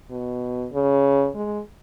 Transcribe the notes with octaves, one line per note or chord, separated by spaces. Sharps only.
B2
C#3
G#3